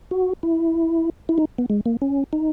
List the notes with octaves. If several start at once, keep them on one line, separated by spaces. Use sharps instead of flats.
F#4
E4
E4
D#4
B3
G#3
A#3
C#4
D#4